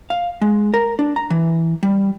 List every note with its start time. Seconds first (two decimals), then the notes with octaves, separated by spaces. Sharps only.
0.10 F5
0.41 G#3
0.74 A#4
0.99 D4
1.16 A#5
1.30 E3
1.83 G3